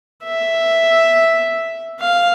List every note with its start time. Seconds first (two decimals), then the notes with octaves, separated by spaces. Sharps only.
0.24 E5
2.00 F5